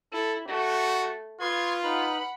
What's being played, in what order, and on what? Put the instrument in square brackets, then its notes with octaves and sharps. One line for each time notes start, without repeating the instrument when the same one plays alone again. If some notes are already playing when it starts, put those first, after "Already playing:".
[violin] E4 [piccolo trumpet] A4
[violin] A3 [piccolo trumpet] F#4
[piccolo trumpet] F4 [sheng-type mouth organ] B4 C#6 D#6 [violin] C6 G#6
[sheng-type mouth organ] D#4 B4 F6 [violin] F#5 B5